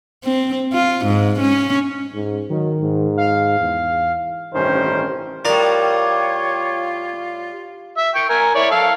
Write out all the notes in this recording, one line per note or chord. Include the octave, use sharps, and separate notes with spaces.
C4
F4
G#2
C#4
G#2
D#3 F#3
G#2
F5
E2
A1 G2 C3 D#3 C#4 C5
A2 G3 F4 A#4 C#5 D5
E5
G5 C#6
A#4 G#5
E4 C#5 D5
A4 F5